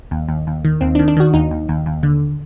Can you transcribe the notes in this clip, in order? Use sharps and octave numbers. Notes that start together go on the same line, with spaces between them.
D#2
D#2
D#2
D#3
D#2 C4
D4
D#3
D4
D#3 F#4
D#2 D#4
D#2
D#2
D#2
D3